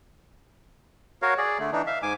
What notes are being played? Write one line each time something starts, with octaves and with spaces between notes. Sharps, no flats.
F#4 A#4 C#5 F5
G#4 D5
D3 A3
E3 D4 D#4
E5 F5
G#2 G#5 D6